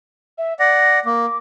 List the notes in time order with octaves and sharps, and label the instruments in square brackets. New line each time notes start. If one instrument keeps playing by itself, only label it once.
[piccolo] E5
[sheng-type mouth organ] D5 F#5 [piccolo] A#6
[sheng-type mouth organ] A#3 [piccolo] D6